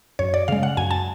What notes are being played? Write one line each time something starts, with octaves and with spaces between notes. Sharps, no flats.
F#2 C#5
D5
C#3 G#3 F5
F#5
F#2 G#5
A5